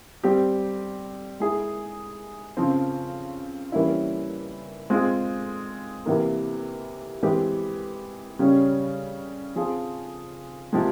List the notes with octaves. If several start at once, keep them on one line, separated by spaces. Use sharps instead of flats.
G3 C4 G4
G#3 E4 G#4
C#3 F3 C4
E3 G3 A#3 C#4 E4
G#3 C4 F4 G#4
C3 E3 A#3
E3 G#3 C4 G4
C#3 G3 C#4
F3 C4 F4 G#4
C3 F3 G#3